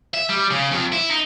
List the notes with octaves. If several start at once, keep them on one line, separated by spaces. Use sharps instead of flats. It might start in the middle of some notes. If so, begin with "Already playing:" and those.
E5
G3
C#3
F2
E4
D#4